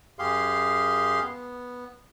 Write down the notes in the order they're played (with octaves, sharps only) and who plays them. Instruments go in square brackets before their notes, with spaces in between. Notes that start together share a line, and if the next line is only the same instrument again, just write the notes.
[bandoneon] F#2 G4 G#4 F5 C6
B3